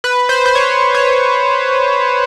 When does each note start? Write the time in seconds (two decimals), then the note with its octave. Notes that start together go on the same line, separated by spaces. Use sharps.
0.04 B4
0.29 C5
0.46 C5
0.55 C#5
0.95 C#5